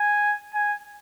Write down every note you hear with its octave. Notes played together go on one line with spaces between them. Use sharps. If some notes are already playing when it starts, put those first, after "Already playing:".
Already playing: G#5
G#5